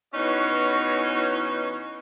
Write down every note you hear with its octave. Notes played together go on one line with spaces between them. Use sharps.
E3 B3 C#4 D#4 F#4 C#5